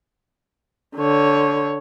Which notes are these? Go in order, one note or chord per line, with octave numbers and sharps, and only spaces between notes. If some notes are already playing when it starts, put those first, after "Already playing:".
D3 C#5